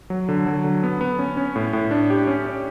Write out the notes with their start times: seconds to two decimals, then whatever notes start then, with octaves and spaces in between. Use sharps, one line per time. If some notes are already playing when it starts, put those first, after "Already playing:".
0.10 F#3
0.29 D3
0.47 F#3
0.64 D3
0.83 B3
1.01 B3
1.19 C#4
1.37 C#4
1.56 A2
1.73 A2
1.91 D4
2.10 G4
2.27 C#4
2.46 C#4